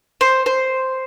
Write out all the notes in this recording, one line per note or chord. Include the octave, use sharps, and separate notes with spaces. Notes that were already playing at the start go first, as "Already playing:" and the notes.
C5
C5